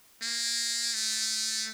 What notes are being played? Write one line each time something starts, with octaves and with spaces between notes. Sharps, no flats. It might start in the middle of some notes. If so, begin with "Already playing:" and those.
A#3
A3